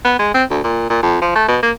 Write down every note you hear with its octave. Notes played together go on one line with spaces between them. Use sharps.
B3
G#3
C4
D2
A#2
A#2
F2
F3
A3
B2
A#3